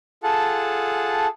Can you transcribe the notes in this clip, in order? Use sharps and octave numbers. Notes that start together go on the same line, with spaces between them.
F4 G#4 A4 F#5 A5